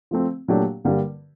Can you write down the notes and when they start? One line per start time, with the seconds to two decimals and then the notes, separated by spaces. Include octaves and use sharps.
0.11 F3 A3 C4
0.48 A#2 F#3 A3 D4 G4
0.85 G2 D3 G3 A#3